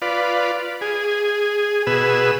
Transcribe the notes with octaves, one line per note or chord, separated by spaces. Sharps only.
F4 B4 D5
G#4
B2 G#4 B4 E6